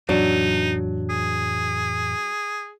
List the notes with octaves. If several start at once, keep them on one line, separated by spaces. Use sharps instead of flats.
F2 A2 E3 F#3 D4 D#4
G#4